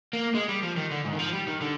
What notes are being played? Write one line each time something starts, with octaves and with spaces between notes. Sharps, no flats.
A#3
G#3
G3
F3
D#3
D3
G#2
D#3
F3
G3
D#3
D3